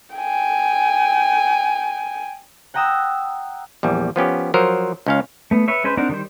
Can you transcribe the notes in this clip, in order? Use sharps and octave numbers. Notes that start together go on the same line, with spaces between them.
G5 G#5
F#5 G5 A#5 D#6 E6
A#1 E2 G3
F3 B3 C#4 G4
F3 F#3 A#4 C5
C#2 C#4 F5
A3 B3
B4 C#5 E5
G#3 C#4 B4 C5
C4 D4 D#4 A#4 F#5
D#3 G3 C5